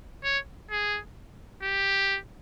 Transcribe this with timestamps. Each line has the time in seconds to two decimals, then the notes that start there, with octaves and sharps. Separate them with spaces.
0.24 C#5
0.71 G#4
1.63 G4